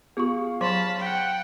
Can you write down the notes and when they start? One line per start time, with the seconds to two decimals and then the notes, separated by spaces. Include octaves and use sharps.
0.17 B3 F4 G4 G#4 F5 C#6
0.61 F#3 C5 A5 B5 C6
0.99 F#5 G5